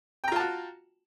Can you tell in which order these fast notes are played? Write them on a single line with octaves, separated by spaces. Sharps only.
G5 A#5 F4 A5 F#4